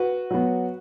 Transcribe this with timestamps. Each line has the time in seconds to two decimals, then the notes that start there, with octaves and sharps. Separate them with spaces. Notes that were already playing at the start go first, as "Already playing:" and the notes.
Already playing: F#4 B4
0.31 F#3 B3